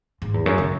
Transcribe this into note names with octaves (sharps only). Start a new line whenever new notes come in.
G#2
E2
F#2
C#3